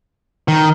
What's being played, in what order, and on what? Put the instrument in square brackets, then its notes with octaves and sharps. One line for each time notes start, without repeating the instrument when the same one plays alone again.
[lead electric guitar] D#3